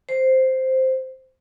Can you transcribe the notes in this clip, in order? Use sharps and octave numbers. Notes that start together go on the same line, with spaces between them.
C5